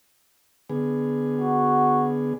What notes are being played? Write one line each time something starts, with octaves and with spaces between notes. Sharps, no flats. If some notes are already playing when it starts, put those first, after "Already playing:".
D3 B3 G#4
F#4